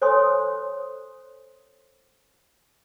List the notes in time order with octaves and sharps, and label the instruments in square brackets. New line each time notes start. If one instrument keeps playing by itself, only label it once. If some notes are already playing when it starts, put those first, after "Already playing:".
[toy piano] A4 C5 C#5 G#5 C6 D#6